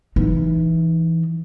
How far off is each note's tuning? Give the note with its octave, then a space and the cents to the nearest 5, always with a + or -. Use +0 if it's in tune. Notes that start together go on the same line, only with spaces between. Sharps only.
E3 +0 D#4 +0